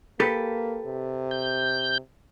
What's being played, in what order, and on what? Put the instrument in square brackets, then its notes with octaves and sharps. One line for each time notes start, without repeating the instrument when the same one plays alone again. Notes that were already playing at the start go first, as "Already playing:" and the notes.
[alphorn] A#3 [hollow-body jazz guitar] G4 A4 B4
[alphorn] C3
[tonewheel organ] G6